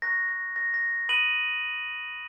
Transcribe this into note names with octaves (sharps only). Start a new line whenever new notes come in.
A#5 C#6 F#6 A#6
A#6
A#6
A#6
B5 D#6 F#6 D#7 F#7